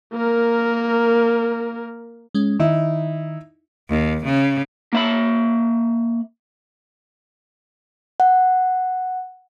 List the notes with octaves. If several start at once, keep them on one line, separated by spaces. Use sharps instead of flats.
A#3 A#4
G#3 C#4
D#3 D#4 E4
D#2
C#3
A#3 E5 B5
F#5